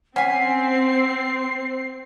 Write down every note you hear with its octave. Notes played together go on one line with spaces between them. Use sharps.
C4 C#4 F#5 G#5 B6 C7